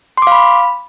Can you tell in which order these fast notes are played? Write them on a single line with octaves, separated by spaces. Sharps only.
C6 D6 F5 B5